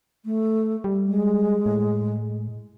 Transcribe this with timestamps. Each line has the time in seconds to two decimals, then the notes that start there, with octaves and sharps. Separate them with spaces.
0.25 A3
0.84 G3
1.08 G#3
1.66 A2